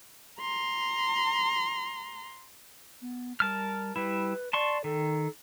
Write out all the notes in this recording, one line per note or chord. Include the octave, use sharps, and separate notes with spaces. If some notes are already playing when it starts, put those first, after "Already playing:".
A#5 C6
B3
G3 A#4 A5 F6
G3 E4 B4
D5 A5 C6 C#6
D#3 A4